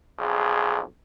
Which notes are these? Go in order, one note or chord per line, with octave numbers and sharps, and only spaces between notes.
B1 F2 G#4